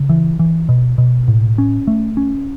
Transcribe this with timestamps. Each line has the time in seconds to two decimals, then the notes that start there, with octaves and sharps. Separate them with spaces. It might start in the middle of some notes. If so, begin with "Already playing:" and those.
Already playing: C#3
0.09 E3
0.39 E3
0.69 B2
0.98 B2
1.28 A2
1.58 C#4
1.87 A3
2.17 C#4